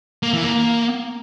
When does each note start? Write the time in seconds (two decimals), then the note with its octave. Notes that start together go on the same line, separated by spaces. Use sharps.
0.23 A#3
0.33 E3
0.44 A#3